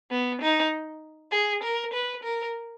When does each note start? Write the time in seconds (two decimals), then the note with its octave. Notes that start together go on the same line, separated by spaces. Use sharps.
0.11 B3
0.42 D#4
1.32 G#4
1.63 A#4
1.93 B4
2.24 A#4